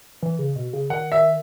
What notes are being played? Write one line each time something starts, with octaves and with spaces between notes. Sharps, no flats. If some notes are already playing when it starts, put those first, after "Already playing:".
E3
C#3
B2
C#3
D#3 F#5
E5